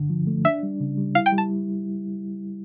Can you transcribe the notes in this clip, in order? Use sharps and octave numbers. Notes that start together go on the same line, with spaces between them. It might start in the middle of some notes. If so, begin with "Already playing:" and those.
Already playing: G2 D3
F3
A3
D4 E5
G3
C#3
G3
E4 F5
G5
G3
A5